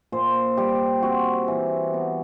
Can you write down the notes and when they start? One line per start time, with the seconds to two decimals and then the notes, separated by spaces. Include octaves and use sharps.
0.12 A#2 C5
0.57 G3 G4
1.02 C4 F#4
1.48 E3
1.94 B3